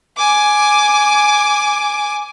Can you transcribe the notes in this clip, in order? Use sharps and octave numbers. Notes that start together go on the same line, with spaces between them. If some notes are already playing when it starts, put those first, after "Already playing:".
G#5 D6